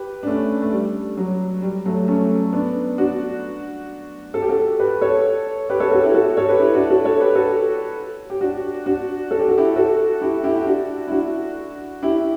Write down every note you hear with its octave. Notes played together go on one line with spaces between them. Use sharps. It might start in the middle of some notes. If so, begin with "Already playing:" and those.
Already playing: G4 B4
D4
A3 C#4
A3
G3
F#3
G3
F#3 A3
A3 C#4
B3 D4
D4 F#4
A4
G4
F#4 A4
G4 B4
A4 C#5
G4 B4
A4 C#5
F#4 A4
E4 G4
F#4 A4
A4 C#5
G4 B4
E4 G4
D4 F#4
F#4 A4
A4 C#5
G4 B4
F#4 A4
G4
D4 F#4
D4 F#4
A4
G4
F#4
E4 G4
F#4 A4
E4 G4
E4 G4
G4
D4 F#4
E4
D4 F#4
E4 G4